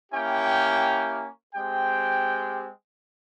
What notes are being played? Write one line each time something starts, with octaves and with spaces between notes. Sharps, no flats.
A#3 C#4 E4 G4 G5
G#3 C4 G4 G5